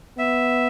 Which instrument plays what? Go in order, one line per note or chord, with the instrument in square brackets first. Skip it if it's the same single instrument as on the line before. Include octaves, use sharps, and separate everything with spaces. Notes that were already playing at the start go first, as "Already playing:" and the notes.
[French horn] B3 [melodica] E5